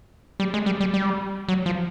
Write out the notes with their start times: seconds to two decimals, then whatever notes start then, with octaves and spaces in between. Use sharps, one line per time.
0.40 G3
0.54 G#3
0.66 G3
0.81 G3
0.94 G3
1.49 F#3
1.66 F3